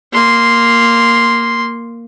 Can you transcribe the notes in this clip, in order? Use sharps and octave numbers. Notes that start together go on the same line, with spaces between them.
A#3 C6